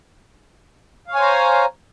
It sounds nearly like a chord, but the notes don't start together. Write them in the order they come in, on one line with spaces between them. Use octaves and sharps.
F5 C#5 G#5 C5 A#5